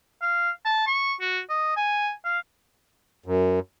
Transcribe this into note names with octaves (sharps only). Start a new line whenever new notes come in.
F5
A5
C#6
F#4
D#5
G#5
F5
F#2